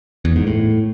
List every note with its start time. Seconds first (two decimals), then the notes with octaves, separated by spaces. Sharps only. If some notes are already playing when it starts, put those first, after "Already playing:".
0.25 E2
0.36 G#2
0.47 A2